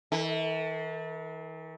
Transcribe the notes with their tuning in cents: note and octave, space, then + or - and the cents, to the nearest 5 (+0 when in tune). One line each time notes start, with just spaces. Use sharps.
E3 -40 A4 +25